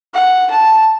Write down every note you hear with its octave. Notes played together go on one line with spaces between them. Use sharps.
F#5
A5